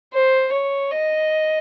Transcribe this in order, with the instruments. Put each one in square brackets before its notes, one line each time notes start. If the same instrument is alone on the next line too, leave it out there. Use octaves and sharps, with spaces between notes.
[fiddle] C5
C#5
D#5